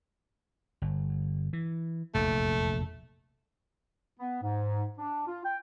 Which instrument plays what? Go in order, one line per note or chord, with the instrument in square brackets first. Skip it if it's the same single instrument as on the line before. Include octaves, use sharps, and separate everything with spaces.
[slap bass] G1
E3
[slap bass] F1 A#1 E2 [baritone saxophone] A3
[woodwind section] B3
G#2
D4
F4
G5